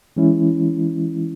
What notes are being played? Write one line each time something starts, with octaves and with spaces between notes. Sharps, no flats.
E3 G#3 C#4 E4